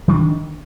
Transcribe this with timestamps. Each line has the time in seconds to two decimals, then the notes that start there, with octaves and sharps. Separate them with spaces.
0.08 D#3
0.11 C#4
0.14 D4